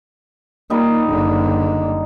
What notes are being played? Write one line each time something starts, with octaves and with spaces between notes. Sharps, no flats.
G3 A#3 D#4
F#1 D3